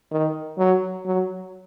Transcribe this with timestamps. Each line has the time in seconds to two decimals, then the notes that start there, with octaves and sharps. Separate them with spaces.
0.12 D#3
0.58 F#3
1.05 F#3